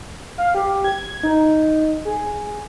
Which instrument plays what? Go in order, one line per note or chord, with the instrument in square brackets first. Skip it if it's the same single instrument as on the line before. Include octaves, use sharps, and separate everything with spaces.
[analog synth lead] F5
G4
G#6
D#4
G#4